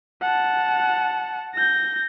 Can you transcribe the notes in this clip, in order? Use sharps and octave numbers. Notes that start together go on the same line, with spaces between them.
F#5 A5
G6 A#6